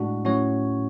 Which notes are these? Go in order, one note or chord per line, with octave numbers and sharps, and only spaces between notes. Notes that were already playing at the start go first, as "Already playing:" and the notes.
Already playing: A2 G#3 D4 F#4
A2 F#3 C#4 F#4 C#5